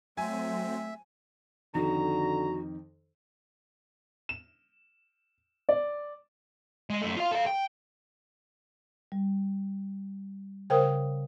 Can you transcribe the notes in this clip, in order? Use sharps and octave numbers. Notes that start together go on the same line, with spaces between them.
F#3 A3 C4 E5 G#5
F2 D3 D#3 D#4 F#4 A#5
E7
D5
G#3 D#5
F#2 A3
F4 F5
A4 F5
G5
G3
C#3 A#4 C5 F5 G5 D#6